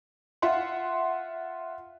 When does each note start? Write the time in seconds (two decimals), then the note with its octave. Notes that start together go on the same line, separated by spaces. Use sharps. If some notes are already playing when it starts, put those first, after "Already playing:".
0.42 F4 E5 F#5 C6